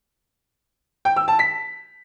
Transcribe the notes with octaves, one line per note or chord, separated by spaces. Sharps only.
G5
E6
A5
B6